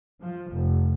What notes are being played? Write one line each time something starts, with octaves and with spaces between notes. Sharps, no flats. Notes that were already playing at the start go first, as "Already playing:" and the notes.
F3
F1